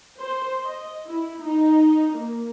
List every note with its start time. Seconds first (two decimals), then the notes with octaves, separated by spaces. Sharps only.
0.20 C5
0.65 D#5
1.07 E4
1.43 D#4
2.15 A#3